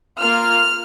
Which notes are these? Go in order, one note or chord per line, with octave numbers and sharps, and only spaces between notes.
A#3 F4 F6